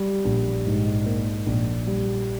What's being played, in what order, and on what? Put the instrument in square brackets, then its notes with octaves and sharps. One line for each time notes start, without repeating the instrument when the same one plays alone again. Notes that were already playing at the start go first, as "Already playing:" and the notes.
Already playing: [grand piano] G3
A#1
G#2
A#3
A#1
G3